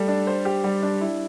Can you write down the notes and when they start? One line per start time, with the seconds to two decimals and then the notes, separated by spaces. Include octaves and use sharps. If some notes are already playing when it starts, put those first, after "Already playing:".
Already playing: G3 A3 A4
0.08 D4
0.27 C5
0.45 G4
0.64 G3
0.82 D4
1.01 E4